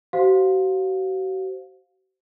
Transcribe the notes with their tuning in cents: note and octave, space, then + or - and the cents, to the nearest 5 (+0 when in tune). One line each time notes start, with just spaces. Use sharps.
F#4 +40 C5 +0 F5 +15